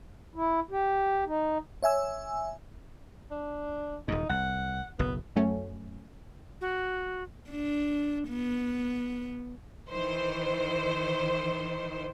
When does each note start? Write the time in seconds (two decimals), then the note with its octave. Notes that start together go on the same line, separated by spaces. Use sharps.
0.35 E4
0.71 G4
1.26 D#4
1.83 C#5 E5 G#5 E6
3.31 D4
4.08 D#1 E2 G#2 D#4
4.29 C2 F#5
4.99 F#1 B1 B3
5.36 F#2 F#3 A3 C#4
6.61 F#4
7.50 D4
8.28 B3
9.90 D#3 E3 C5